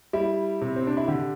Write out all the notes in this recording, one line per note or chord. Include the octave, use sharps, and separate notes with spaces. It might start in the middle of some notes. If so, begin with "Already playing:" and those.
G3 E4
C3
C4
D4
E4
D3 G4